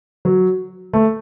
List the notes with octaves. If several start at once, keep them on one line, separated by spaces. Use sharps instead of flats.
F#3
A3